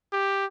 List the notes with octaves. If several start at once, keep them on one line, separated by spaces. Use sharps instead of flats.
G4